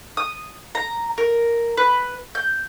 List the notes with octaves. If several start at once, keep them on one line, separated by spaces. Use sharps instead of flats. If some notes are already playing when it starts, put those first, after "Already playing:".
D#6
A#5
A#4
B4
G6